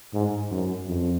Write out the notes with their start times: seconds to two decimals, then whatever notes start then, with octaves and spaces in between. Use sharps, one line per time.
0.14 G#2
0.51 F#2
0.87 F2